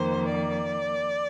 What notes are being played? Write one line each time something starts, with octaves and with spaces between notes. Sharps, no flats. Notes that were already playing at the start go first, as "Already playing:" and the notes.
Already playing: F2 D#3 A#3 C5
D5